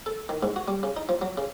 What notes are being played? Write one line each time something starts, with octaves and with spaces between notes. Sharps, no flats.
A4
D#3
G#2
F#4
G3
C#3
D#4
F3
F#3
C#3